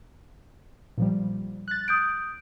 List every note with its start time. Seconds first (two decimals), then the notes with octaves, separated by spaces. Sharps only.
0.98 A#2 F3 G3
1.68 F#6 A6
1.88 D#6 G6 D7